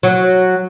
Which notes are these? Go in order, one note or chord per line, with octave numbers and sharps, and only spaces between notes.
F#3